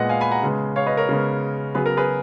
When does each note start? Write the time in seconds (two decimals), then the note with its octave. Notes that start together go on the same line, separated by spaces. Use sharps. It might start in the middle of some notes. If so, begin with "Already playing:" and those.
Already playing: A#2 G#3 B3 D#5 F#5
0.09 F5 G#5
0.21 G#5 B5
0.31 F#5 A#5
0.43 C#3 G#3 B3
0.76 C#5 F5
0.86 B4 D#5
0.97 A#4 C#5
1.09 C#3 G#3 B3
1.75 C#3 F#3 B3 G#4 B4
1.86 A#4
1.97 G#4 B4